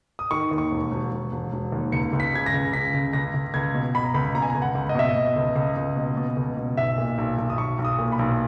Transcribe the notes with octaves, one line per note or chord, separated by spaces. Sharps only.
D#6
D#3 C#6
D#2
C#6
E1
E1
E1
E1
E1
D#2
C#2 C#7
C#2
B6
C#3 G#6
A#6
C#2
C#3 B6
C#2
C#2 A#6
C#2
C#2 G#6
B2
B2 B5
A#5
C#2 B5
B2 A#5
G#5
A#5
C#2
F#5
C#2
D#5
B2 E5
D#5
B2
C#2
C#2
C#2
B2
B2
C#2
B2
B1 E5
A#2
B1
B1
D#6
B1 C#6
B1
D#6
A#2
B5
B1